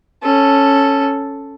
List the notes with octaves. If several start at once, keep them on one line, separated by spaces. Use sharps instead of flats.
C#4 A4